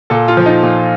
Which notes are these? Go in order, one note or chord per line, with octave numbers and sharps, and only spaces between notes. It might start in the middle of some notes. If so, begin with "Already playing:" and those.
A#2 A4
F4
F3
D#4
A#2